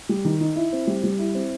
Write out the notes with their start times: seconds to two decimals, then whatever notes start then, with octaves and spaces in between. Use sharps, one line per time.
0.09 G3
0.25 D#3
0.41 D#4
0.56 E4
0.73 C4
0.87 G3
1.04 G3
1.19 E4
1.35 C4